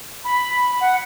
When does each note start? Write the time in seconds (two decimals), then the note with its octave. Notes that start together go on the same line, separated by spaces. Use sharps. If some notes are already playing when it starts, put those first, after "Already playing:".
0.24 B5
0.81 F#5